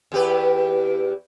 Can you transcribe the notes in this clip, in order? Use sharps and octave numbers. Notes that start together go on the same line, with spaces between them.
E2 G4 B4